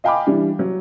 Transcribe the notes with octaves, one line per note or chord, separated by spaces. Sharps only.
D#5 F5 G5 G#5 B5 D6
E3 G3 D4
F#3